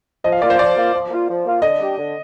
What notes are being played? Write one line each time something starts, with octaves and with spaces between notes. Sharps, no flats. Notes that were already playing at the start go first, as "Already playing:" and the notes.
F3 D#5
F5
A#3 F4 D5
C5
F3 D5
A#3 F4
F3
A#3 F4
F3
A#3 F4
D3 D#5
G3 D4 G4
D3